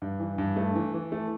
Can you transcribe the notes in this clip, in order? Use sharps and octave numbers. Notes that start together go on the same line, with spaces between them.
G2
E3
G2
A3
E3
E3
A3